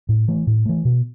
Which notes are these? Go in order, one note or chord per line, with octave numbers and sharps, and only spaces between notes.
A2
E3 A3
A2
E3 A3
B2